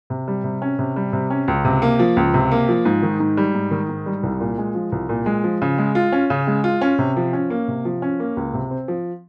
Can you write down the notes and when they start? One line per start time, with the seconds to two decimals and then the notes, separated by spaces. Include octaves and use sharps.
0.10 C3
0.28 G3
0.44 C3
0.62 C#4
0.79 C3
0.96 G3
1.13 C3
1.30 C#4
1.48 C#2
1.65 C3
1.82 A#3
1.99 F3
2.17 C#2
2.34 C3
2.51 A#3
2.69 F3
2.85 G#2
3.03 D#3
3.20 G#2
3.37 G3
3.54 G#2
3.71 D#3
3.89 G#2
4.06 G3
4.23 C2
4.41 A#2
4.58 G#3
4.75 F3
4.92 C2
5.09 A#2
5.26 G#3
5.44 F3
5.62 C#3
5.78 G#3
5.95 F4
6.12 C#4
6.30 C#3
6.47 G#3
6.64 F4
6.81 C#4
6.99 C3
7.17 F3
7.33 C#4
7.50 A#3
7.68 C3
7.85 F3
8.02 C#4
8.20 A#3
8.37 C#2
8.54 C3
8.71 C4
8.88 F3